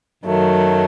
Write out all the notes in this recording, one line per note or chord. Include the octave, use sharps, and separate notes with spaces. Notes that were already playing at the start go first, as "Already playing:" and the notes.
F#2 D#3 F#3 A3